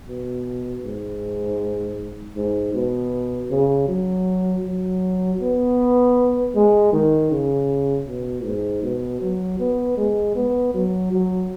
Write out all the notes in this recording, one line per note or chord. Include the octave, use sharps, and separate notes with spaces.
B2
G#2
G#2
B2
C#3
F#3
F#3
B3
G#3
D#3
C#3
B2
G#2
B2
F#3
B3
G#3
B3
F#3
F#3